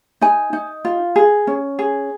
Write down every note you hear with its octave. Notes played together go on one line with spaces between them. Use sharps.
D#4 G#5
D#4
F4
G#4
C#4
G#4